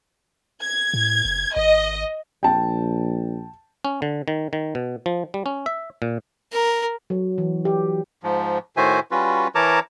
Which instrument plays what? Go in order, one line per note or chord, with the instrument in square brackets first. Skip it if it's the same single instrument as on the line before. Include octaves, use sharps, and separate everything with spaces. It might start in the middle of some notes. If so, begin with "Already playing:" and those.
[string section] G#6
[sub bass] A2
F#1
[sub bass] G#1 [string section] D#5
[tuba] A#1 [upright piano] G5 A5
[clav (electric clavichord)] C#4
D3
D#3
D#3
B2
F3
G3
C#4
E5
A#2
[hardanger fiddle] A#4
[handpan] F#3
E3
G4
[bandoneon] G#2 F3
A2 D#3 F#4 C5 E5 G#5
G3 C#4 F4 F#4 B4
E3 A#4 C#5 A5 A#5 D6